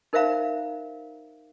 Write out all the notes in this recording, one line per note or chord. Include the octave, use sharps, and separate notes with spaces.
D#4 A#4 C5 E5 F5 A#5